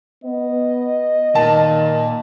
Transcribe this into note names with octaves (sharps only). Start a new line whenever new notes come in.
B3 D#5
A#2 D#3 A5